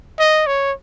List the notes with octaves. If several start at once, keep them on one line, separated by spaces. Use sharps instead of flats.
D#5
C#5